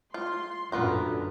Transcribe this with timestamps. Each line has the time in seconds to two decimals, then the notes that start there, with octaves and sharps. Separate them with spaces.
0.14 F4 C6
0.72 F#2 A#2 D3 B3 F4 A#5